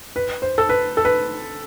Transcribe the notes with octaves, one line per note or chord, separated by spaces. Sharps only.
B4
C5
A4
B4
A4
B4